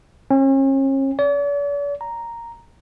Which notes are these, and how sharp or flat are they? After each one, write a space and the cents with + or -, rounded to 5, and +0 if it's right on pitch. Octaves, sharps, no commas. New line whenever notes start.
C#4 -40
D5 -45
A#5 +0